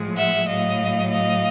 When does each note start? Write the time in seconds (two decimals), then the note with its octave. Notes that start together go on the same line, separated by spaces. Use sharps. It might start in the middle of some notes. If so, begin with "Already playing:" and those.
Already playing: A2 F3 G#3
0.16 E5 F#5
0.47 A2 F#3 D#5 F5
1.10 D#5 F5